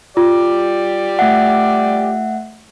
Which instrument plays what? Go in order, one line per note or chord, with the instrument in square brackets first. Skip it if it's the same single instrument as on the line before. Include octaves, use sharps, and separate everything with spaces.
[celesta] F4 [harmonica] G4 D5
[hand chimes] A3 E5 F#5